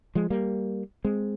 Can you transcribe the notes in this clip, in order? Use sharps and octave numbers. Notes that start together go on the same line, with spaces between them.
F3 G#3
G3 A#3
G#3 C4